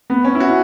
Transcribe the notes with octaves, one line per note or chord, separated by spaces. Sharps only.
B3
C#4
E4
F#4